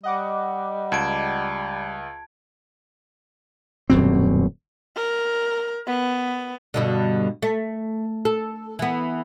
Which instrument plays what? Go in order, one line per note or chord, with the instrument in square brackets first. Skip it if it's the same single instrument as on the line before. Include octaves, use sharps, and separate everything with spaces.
[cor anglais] G3 [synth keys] D#5 F#5 D6
[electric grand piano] C#2 [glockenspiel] A5 G#6 D7
[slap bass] D#1 F#2 B2 C4
[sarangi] A#4
B3
[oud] G2 B2 D3
A3
A4
E3 B3